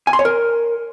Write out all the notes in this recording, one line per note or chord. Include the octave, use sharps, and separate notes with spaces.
G#5
C6
C#5
A#4